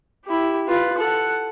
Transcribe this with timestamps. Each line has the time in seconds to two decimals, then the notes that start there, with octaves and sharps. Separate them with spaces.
0.25 E4 G4
0.68 F4 B4
0.98 A4 F#5